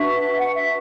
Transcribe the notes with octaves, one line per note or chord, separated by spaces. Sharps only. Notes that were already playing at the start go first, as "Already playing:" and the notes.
Already playing: D4 F#4 B4 E5
F#5
E5